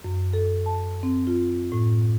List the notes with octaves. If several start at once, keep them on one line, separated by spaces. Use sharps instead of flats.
F#2
A4
A5
C4
F4
A2